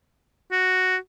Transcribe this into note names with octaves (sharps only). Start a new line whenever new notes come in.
F#4